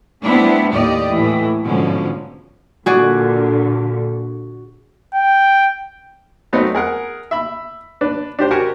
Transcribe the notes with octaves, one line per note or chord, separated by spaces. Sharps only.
G3 A3 B3 C4 D4 E4
D#2 A2 A3 G4 D5 D#5
A2 E3
G#2 B2 D3 F3 C#4
A#2 D3 F#4 G#4 D5
G5
F#3 A3 B3 C4 D#4
G#4 A#4 F#5
E5 B5
D4 B4
D4 G4 C5
F#4 G4 A#4 F#5 G#5